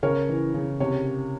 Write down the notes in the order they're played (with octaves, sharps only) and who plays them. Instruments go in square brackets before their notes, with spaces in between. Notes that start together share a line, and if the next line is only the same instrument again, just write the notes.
[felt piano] C#3 A#4 C#5
E3
C#3
C3 C#5